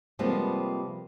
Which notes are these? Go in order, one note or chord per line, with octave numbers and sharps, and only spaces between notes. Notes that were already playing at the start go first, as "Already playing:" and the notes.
C3 F3 G3 G#3 A#3 B3